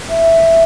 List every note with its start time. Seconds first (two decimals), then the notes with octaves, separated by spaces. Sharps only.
0.09 E5